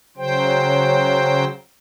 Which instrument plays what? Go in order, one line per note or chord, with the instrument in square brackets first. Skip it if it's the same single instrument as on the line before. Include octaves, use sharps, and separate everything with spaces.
[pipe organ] C#3 F#3 C5 G5